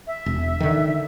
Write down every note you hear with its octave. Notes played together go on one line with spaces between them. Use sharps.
E5
E1
D3 D#3